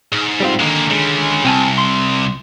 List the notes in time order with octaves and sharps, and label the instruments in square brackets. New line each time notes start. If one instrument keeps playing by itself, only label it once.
[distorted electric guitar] G#2
[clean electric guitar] G3 C4 F4
[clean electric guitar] D3 D#3 D#4 [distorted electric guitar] G#3 A#3
[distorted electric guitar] C#3 G#3
[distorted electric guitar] C2 [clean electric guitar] C4 G#5 A5
[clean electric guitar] C6